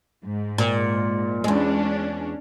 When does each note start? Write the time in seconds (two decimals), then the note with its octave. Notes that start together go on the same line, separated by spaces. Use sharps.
0.24 G#2
0.58 A#2
1.44 E2 G#3 C#4 D4